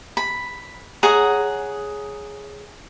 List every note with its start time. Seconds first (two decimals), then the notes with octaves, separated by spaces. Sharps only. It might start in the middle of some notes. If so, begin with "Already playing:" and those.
0.17 B5
1.03 G#4 C#5 F#5 A#5